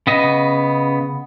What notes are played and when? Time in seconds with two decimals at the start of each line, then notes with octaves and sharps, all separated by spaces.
0.07 C#3 B3 D#5